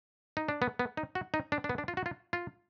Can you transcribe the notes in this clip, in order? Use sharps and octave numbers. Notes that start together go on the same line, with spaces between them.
D#4
D4
B3
B3
D#4
F#4
D#4
D4
D4
B3
D4
F4
F#4
F4
F4